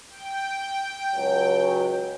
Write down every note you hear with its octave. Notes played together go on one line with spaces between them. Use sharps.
G5
C#2 F#3